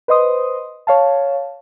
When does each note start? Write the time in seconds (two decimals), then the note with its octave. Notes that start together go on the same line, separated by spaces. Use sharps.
0.08 B4 C5 D#5 C6 D#6
0.87 C#5 F5 A5